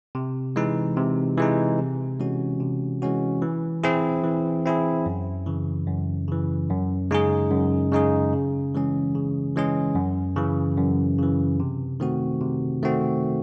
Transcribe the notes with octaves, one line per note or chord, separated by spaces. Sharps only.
C3
E3 G#3 D#4
C3
E3 G#3 D#4
C3
E3 G#3 C#4 F#4
C3
E3 G#3 C#4 F#4
E3
C4 E4 G#4
E3
C4 E4 G#4
F#2
C#3 E3
F#2
C#3 E3
F#2
C#3 G#3 D#4 G#4
F#2
C#3 G#3 D#4 G#4
C#3
E3 G#3 C#4 G#4
C#3
E3 G#3 C#4 G#4
F#2
C#3 E3
F#2
C#3 E3
C3
D#3 A3 C4 F#4
C3
D#3 A3 C4 F#4